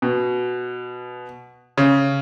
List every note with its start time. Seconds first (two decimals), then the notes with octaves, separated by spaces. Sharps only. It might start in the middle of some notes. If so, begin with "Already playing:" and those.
0.02 B2
1.77 C#3